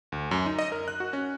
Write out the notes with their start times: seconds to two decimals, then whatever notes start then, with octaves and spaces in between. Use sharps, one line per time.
0.12 D2
0.31 F#2
0.46 D#4
0.59 D#5
0.72 A#4
0.88 F#6
1.00 F#4
1.13 C#4